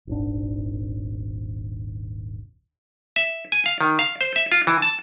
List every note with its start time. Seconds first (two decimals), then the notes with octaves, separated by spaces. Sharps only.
0.07 D#1 G#1 D4
3.16 E5
3.52 G#5
3.66 F5
3.81 D#3
3.99 F5
4.21 C5
4.36 E5
4.52 F4
4.67 E3
4.82 A5